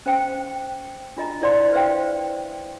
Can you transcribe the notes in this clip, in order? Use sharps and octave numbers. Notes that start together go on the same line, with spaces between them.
C#4 C5 F5 G5
D4 F4 D#5 A#5
E4 C5 D5 F5 C6
B4 C5 E5 F5 G5